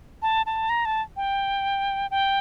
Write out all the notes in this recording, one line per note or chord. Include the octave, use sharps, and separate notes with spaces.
A5
A5
A#5
A5
G5
G5